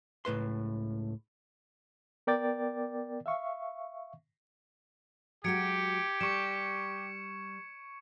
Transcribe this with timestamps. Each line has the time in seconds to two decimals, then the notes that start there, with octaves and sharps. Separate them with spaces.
0.25 C#2 A2 B4 C6
2.27 B3 A#4 D5 G5 D6 A6
3.26 E5 F5 C#6
5.44 F#3 G#3 F#4 G4 G#6 C#7 D7
6.21 G3 C#6 C#7 E7